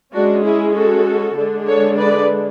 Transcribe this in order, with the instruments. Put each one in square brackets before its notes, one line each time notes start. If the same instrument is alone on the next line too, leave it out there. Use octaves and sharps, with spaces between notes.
[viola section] G#3 C#4 D4 F#4
E4 G#4
F#4 A4
D3 G#3 D4
A4 C#5
B4 D5